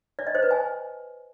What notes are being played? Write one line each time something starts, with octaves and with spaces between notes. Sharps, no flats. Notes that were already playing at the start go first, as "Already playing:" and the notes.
D5
D#5
C5
B4
G#5